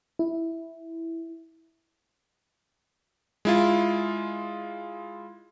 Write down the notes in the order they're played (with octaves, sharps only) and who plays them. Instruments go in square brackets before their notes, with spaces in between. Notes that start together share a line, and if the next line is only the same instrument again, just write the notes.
[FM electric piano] E4
[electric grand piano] G#3 E4 F4